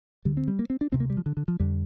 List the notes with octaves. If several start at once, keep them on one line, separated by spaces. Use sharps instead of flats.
D2 D3 G3
C4
G3
A#3
C4
D4
D2 C3 C4
A#3
G3
F3
D3
D3
F3
F2 D3 G3